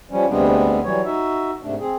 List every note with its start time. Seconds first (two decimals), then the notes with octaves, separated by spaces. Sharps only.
0.11 F3 G3 C#4
0.29 D2 C3 G3 G#3 B3 D4
0.84 E3 F#3 G3 C#5
1.05 D#4 F#4 E5
1.63 G#2 C3 A3 D4
1.79 C4 G#4